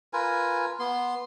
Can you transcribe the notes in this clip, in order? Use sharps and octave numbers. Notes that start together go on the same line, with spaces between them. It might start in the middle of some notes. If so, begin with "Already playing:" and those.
F4 A#4 B4 G#5
B3 C6